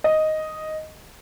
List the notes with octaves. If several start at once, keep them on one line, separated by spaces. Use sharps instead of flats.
D#5